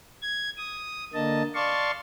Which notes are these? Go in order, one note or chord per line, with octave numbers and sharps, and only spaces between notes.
G#6
D#6
D3 A#3 D#5 A5
D5 F5 A5 C6 C#6